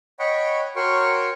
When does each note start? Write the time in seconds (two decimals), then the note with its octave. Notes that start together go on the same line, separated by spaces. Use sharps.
0.19 C#5 D#5 F#5 G5 B5 C#6
0.76 F#4 A#4 C#5 G5 C6 C#6